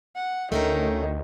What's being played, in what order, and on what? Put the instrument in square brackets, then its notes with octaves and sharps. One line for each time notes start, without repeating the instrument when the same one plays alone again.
[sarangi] F#5
[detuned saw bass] D2 [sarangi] D#3 [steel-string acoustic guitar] A3 C#4 A#4